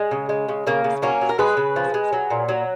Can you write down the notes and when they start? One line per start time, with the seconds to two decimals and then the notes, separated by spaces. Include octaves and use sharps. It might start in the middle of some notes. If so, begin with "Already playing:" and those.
Already playing: G#3
0.11 C#3
0.29 G#3
0.49 C#3
0.67 C#3 A#3
0.84 C#3
1.02 F#3 A#3 C#4
1.21 F#3
1.29 A#4
1.38 G#3 G#4 B4
1.57 C#3
1.76 F3
1.94 G#3
2.13 F#3
2.30 A#2
2.49 F#3